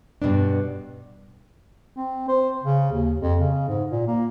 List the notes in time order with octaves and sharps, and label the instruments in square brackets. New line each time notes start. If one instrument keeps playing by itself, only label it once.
[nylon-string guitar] G2 B2 B3 D4
[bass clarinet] C4
C5
C#3
D#2
F2
C#3
G#2
A#2
A#3